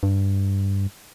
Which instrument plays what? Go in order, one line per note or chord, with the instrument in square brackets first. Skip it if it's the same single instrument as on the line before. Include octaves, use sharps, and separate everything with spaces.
[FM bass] G2